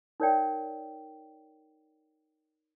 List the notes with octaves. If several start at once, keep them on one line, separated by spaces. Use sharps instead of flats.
D#4 A#4 C#5 D5 G5